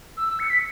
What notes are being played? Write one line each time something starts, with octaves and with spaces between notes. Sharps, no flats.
E6
E6
C#7
B6